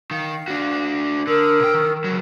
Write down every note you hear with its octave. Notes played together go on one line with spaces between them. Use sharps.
D#3 F5
D4 F#4
D3 A#4 D#6 E6
B2 G5
D#3
C#2 F#3